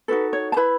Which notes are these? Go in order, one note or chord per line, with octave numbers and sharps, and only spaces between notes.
D#4 F#4 A4 B4
C#5
A5
E4 B4 B5